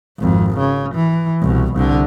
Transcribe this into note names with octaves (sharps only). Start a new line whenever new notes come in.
G#1 F2
C#3
E3
C2 B2
C2 D3